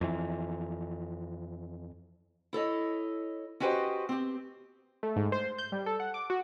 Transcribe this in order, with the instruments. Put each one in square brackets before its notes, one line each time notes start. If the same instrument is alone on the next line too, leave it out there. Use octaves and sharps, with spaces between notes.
[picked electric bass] F2 E3
[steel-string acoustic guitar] E4 A4 C#5 D#5
C#4 F#4 G4 B4 C5 D#5
C4 G4
[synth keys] A3
G#2
C5
G6
G3
A4
F#5
D6
F#4